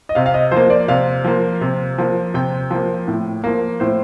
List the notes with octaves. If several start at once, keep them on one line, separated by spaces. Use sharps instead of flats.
D#5
C3 F5
F5
D#5
F3 A#3 C5
D5
C3 F5
F3 A#3
C3
F3 A#3
C3 G5
F3 A#3
A2
F3 A#3
A2 C5